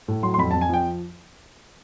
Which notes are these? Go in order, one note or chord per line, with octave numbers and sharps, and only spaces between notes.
A2
F#3 C6
C6
F2 B5
F2 A5
G#5
F3 G5